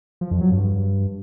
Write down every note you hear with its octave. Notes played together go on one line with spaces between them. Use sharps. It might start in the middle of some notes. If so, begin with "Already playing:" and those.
F3
F2
F#3
G2